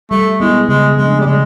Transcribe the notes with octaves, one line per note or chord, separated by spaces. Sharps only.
G3 A3
G#3 B3 E4
C#3 G#3
F3 G#3 A3 D4
G3
C#3 G#3